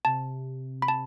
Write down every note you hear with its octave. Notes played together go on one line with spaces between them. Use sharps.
C3 A5
B5
A5